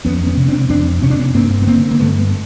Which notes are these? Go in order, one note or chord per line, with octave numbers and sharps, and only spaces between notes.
F2 B3 C#4
B3 C#4
C3
C4 D4
F2 C4 D4
C3 C#4
D4
B3 C#4
G2 A#3 C4
B3
D3 A#3 C4
A#3
G2 A3 B3